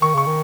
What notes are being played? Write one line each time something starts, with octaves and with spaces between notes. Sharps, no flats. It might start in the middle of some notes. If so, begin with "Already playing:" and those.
D#3 C#6
C#3 C#6
D#3